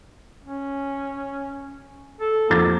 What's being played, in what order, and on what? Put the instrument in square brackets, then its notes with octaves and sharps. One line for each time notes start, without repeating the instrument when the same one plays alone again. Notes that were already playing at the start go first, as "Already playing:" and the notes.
[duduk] C#4
A4
[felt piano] F2 D6 A6 [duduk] A#3